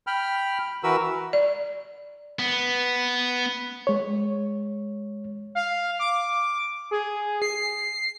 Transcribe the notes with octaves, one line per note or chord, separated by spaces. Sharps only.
G5 B5 F6
E3 F#4 A#4 B4 E6
D5
B3
G#3 C#5
F5
D6
G#4
C7